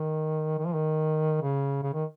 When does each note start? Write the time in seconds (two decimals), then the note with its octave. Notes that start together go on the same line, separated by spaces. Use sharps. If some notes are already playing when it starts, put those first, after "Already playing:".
Already playing: D#3
0.58 D#3
0.66 F3
0.74 D#3
1.41 C#3
1.83 C#3
1.94 D#3